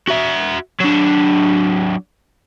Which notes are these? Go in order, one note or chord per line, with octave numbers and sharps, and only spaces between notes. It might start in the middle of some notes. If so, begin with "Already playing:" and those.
F#4 E5
F#3 D4